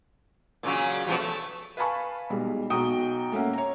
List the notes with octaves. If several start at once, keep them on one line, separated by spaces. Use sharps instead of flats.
A#2 C#3 F#3
B2 F3 G3
A3
B4 F5 G#5 A5 B5 C#6
B1 G3 G#3
B1 F#4 G5 A#5 D#6
A3 A#3 C#4 E5 F#5
C#5 A#5